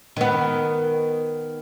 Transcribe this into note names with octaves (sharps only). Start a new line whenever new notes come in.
D#3 B3